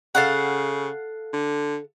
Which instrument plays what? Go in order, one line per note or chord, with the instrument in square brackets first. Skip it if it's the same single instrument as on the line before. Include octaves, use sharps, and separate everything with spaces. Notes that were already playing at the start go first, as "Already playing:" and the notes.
[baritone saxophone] C#3 [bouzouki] A4 F5 F#5
[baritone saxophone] D3